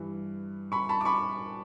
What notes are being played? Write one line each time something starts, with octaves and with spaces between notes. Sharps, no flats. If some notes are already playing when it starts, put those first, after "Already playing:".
Already playing: G2 E3
B5 C#6
A5 B5
D6
B5 C#6